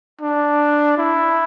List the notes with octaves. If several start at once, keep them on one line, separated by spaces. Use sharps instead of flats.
D4
E4